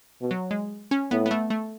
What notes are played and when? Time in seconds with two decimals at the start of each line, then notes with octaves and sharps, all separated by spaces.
0.21 B2
0.31 F#3
0.51 G#3
0.91 C#4
1.11 A2 B3
1.26 B3
1.31 A3
1.50 A3